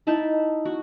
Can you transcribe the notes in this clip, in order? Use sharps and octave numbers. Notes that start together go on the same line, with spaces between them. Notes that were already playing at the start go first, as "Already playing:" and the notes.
D#4 E4 A5 B5
F#4